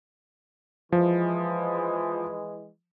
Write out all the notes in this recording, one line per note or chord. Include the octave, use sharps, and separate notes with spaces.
E3 F3 G#3